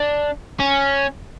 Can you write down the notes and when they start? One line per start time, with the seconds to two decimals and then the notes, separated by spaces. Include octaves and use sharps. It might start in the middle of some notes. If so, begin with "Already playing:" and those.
Already playing: D4
0.60 C#4